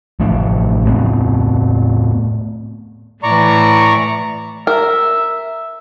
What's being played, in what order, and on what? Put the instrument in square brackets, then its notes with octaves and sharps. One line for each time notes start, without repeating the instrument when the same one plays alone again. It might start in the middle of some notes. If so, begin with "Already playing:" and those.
[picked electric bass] A1 F3 A3 D4
A2 A3 B3 C4
[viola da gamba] A2 E3 [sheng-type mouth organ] D5 A#5 C#6
[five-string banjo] A#4 [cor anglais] E5